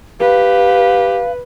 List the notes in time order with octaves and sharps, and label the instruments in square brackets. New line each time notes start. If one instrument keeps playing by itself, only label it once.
[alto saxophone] G4 [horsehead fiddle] B4 [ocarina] F5